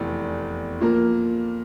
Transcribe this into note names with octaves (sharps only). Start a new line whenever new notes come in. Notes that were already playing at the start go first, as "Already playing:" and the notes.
Already playing: F1 E2 E3
A#2 F3 A#3 F4 A#4